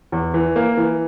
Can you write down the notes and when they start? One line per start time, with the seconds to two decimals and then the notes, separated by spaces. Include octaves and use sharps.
0.12 E2
0.34 E3
0.56 A#3
0.77 E3